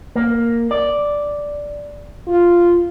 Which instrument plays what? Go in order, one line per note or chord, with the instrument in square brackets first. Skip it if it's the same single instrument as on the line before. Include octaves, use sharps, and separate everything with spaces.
[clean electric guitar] A#3
D5
[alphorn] F4